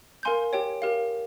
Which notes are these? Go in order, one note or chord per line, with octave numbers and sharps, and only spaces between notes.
A#4 F5 G#5 C6 G6
G4 C#5 G5
G4 A#4 F5